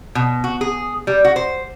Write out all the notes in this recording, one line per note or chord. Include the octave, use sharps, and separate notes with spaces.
B2
F#4
G#4
G3
F#4
C5